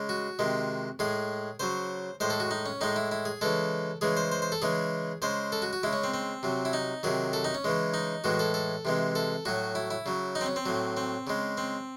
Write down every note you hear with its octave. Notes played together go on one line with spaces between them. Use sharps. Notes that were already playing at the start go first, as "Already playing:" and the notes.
Already playing: C#3 G#3
F#4
C3 D#3 G#3
A2 G#3 G#4
C#3 F#3 C5
A2 G#3 C5
A4
F#4
D#4
C#4
A2 G#3 D#4
E4
E4
G#4
C#3 E3 G#3 A4
C#3 E3 G#3 G#4
C5
C5
C5
A4
C#3 E3 G#3 G#4
C#3 G#3 C5
A4
F#4
F#4
C#3 G#3 E4
C#4
C4
C4
C3 F#3
E4
D#4
C3 D#3 F#3 G#4
A4
D#4
C#4
C#3 E3 G#3
D#4
A2 E3 G#3 F#4
A4
A4
C3 E3 G#3
A4
A2 F#3 F#4
E4
E4
C#3 F#3
D#4
C4
C#4
C4
A2 F#3
C4
C#3 G#3
C4